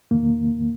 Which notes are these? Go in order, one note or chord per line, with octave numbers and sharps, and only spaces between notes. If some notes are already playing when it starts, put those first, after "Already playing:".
E2 D#3 A#3